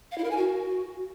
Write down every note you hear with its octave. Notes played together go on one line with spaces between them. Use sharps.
F5
E4
A#4
G#5
F#4